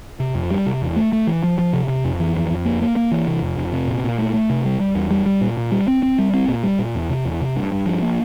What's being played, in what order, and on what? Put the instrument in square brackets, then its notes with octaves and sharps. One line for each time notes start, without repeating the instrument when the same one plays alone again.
[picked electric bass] C3
F2
G3
C3
E2
A3
A3
E3
F3
F3
C3
C3
F2
E3
F2
F2
A#3
A#3
A#3
E3
C3
F2
F2
C3
A#2
A#2
A3
A3
C3
G3
G3
E2
G3
G3
A#2
A#2
G3
C4
C4
G3
C4
A#2
G3
A#2
E2
C3
E2
C3
G2
G2
F3
A#3